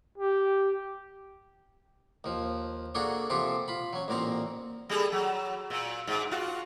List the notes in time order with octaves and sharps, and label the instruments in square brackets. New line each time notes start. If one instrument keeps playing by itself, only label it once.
[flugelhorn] G4
[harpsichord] D#2 F3
A#3 D4 F#4 G#4 A4
C3 F3 F4 G4 A4
F4 B5
F#3 C#4
A1 A#2 A#3 C4 A#5
[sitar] G3 G#4 A4
F#3
A#2
G#2
F4 F#4